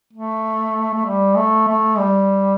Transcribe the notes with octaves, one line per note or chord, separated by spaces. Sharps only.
A3
A3
G3
A3
A3
G3